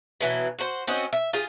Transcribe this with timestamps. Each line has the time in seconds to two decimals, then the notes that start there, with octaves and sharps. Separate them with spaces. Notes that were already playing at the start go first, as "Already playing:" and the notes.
0.21 B2 E3 F#3
0.59 F#4 C5
0.87 C4 C#4 F#4 D#5
1.13 E5
1.33 F4 G4 G#4